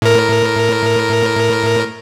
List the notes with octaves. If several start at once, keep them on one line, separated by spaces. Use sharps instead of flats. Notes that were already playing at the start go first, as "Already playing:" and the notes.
A2 A#4